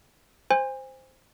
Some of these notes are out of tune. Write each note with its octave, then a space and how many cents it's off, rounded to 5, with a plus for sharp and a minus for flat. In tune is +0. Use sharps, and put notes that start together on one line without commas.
C5 +0 G#5 -35